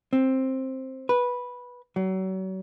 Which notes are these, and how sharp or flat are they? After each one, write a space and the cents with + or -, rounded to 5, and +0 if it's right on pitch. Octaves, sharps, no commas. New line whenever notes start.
C4 +10
B4 -10
F#3 +35